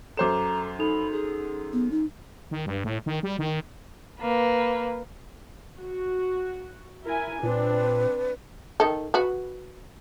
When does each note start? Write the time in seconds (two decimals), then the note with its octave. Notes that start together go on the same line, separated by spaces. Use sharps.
0.17 F#2 A4 C5 A#5 D6 E7
0.79 D#4 A4 B5 F7
1.11 G#4
1.73 B3
1.91 D#4
2.51 D#3
2.66 G2
2.84 A2
3.06 D#3
3.23 G3
3.39 D#3
4.20 A#3 B4
5.78 F#4
7.04 E4 A#4 G#5
7.43 A#2 C4 D4 B4
8.80 D#3 A4
9.14 F#4 B4